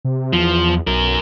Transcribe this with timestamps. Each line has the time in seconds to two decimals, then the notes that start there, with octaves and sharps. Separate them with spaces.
0.05 C3
0.33 E2 F3
0.87 B1 F#3 A#4